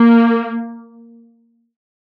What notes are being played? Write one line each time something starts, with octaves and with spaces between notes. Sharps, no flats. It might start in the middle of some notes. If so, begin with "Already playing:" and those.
Already playing: A#3